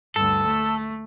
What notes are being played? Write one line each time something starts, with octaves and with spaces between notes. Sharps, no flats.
D2 G2 A4 E6
A3